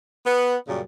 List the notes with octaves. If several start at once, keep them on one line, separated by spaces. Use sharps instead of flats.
B3
F#2 A#2 C#3 G3